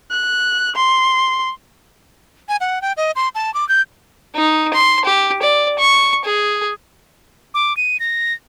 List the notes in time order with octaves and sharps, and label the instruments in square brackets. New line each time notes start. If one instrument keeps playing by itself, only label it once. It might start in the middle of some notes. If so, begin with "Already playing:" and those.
[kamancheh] F#6
C6
[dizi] G#5
F#5
G5
D#5
C6
A5
D6
G6
[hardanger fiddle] D#4
C6
G4
D5
C#6
G#4
[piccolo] D6
D#7
A#6